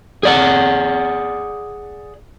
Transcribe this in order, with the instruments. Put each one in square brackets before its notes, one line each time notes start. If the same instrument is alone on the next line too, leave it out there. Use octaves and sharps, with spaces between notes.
[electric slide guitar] G#4 D5 F#5